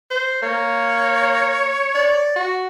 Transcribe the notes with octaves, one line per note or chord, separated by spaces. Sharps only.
C5
A#3 C#5
D5
F#4